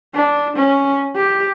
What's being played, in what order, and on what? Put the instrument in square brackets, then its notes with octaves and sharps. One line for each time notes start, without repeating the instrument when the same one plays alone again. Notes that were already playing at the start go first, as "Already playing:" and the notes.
[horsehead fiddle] D4
C#4
G4